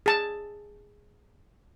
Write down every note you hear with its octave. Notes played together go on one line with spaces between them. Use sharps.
G#4 A5